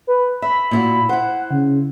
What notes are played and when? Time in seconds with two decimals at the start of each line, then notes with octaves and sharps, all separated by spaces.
0.07 B4
0.42 E5 B5
0.71 A#2 E4 F#4
1.09 E4 C5 F#5
1.51 C#3